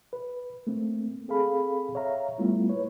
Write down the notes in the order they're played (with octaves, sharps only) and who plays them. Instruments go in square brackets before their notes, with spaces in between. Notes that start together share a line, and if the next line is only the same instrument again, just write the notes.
[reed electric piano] B4
A3 A#3 C4
C4 G#4 A4 F5 B5
C#5 E5 F5 A#5
G3 A3 B3 E4 F4
A#3 B4 C#5